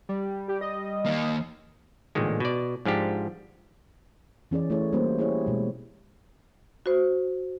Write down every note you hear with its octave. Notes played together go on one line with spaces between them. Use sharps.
G3
G4
D#5
D#2 A#3
A1 A#2 D3 D#3 G#3
B2 D5
G#2 F3 D4 G4
E3 C#4 G#4 D5
A3 E4 G#4 C#5
G3 A#3 C#4 D4 F#4 C5
E4 G4 G#4 C5 C#5
B2 G#3
F#4 C5